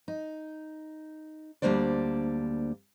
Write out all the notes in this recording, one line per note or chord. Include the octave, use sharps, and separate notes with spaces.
D#4
D2 G3 A#3 D4 C5 D5